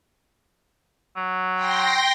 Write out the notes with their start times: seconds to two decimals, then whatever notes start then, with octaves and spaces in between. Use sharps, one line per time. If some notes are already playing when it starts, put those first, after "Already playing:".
1.17 F#3
1.54 G5 C6 A#6